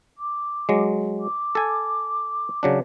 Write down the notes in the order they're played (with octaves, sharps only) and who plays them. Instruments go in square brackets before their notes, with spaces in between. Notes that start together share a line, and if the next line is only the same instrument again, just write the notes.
[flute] D6
[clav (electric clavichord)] F#3 G#3
[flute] D6
[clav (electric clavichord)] A4 G#5
C#3 F#3 D4